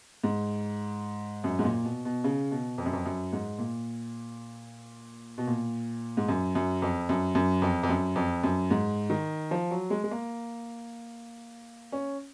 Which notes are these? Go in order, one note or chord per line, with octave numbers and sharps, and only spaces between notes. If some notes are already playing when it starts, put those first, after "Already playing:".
G#2
F#2
G#2
A#2
B2
B2
C#3
B2
F2
F#2
F2
F#2
G#2
A#2
B2
A#2
G#2
F#2
F#2
F2
F#2
F#2
F2
F2
F#2
F2
F#2
G#2
D#3
F3
F#3
G#3
G#3
A#3
C#4